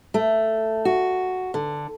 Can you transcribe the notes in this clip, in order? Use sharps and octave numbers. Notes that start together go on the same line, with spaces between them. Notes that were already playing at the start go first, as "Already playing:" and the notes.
A3
F#4
D3